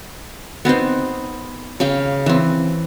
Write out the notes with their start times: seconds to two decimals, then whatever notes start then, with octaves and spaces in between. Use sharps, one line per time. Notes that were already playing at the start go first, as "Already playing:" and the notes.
0.65 B3 C4 D#4 C5
1.80 C#3 F5 G5
2.26 E3 C4